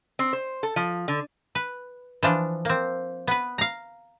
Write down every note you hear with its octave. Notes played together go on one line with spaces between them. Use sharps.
C4
C5
A4
F3
D3
B4
E3 F3 D4
A#3 C4
B3 B4
F5 A#5